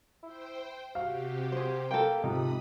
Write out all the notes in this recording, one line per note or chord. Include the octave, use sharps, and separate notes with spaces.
E4 C5 G5
C3 F#4 G4 F5
G#4 C5
A#3 A4 G5
G#2 C3 F3 D#4 B5 D#6